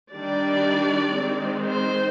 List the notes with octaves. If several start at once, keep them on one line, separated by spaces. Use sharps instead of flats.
D#3 G3 D4 D5
D#3 G#3 C4
C5